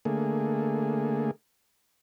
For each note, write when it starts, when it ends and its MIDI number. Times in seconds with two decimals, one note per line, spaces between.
0.05 1.31 50
0.05 1.31 57
0.05 1.31 58
0.05 1.31 68